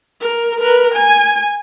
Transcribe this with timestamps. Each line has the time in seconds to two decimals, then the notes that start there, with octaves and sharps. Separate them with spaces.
0.21 A#4
0.60 A#4 B4
0.95 G#5